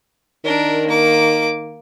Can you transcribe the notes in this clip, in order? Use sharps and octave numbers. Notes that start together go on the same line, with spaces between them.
D#3 D4 A#4
A#3 D6